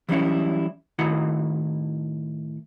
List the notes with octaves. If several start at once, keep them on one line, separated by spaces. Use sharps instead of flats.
E3 F#3 G3 A#3 C#4 E4
A2 D#3 E4 F#4 F#5